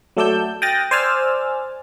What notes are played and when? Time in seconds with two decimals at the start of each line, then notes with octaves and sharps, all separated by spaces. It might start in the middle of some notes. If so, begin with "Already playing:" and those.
0.17 F#3 A3 A4 D5 E6 G6
0.62 G5 D#6 F6 F#6 A6 A#6
0.91 C5 D5 G#5 E6 F6 A6